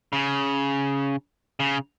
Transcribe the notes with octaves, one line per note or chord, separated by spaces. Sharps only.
C#3
C#3